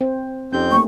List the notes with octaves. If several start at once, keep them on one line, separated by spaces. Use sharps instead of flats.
C4 C5
F2 C4 C#4 D#4 G4 G6
A3 A#3 C#6